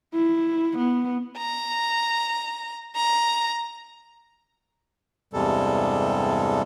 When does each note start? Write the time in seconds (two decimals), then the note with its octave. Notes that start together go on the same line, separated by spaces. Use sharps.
0.14 E4
0.78 B3
1.38 A#5
2.96 A#5
5.33 E2 G2 C3 G3 G#3 A4